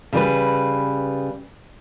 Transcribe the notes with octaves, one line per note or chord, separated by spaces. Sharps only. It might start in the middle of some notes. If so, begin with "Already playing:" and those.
C#3 G3 B4